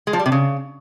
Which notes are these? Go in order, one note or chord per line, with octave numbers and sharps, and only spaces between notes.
G#3
F3
G3
C3
C#3